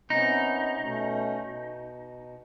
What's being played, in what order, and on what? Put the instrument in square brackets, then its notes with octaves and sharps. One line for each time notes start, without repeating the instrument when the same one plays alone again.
[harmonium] C3 B3 C#4 [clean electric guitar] D#4
[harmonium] B2 A3 C#4
B2